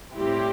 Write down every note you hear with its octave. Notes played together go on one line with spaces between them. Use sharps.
A2 G3 C4 E4 G4